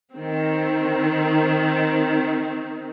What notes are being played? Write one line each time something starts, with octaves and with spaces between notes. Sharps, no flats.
D#3 C4